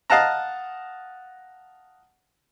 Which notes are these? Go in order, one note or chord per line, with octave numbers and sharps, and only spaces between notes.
D#5 F5 F#5 A5 A#5